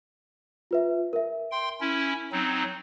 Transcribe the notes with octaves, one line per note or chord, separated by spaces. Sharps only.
F4 B4 E5
A#4 E5
G5 C6
C#4 E4
F#3 C4 D#4